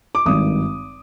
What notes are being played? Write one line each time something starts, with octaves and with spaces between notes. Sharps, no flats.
D6
G#1 G2 D#3 D#6